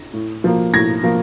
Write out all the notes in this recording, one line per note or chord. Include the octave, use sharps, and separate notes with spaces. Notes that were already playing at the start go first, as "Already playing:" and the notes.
Already playing: A#6
A2
F3 A#3
A2 G#6 A#6
F3 A#3